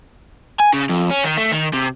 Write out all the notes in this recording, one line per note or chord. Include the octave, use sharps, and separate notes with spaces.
G#5
C#3
F2
C#4
D#3
A3
D#3
C3